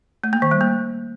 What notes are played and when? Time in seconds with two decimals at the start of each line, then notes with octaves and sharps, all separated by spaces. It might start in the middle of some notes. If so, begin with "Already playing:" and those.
0.24 A3
0.33 A#3
0.42 D#3
0.51 G3
0.61 A#3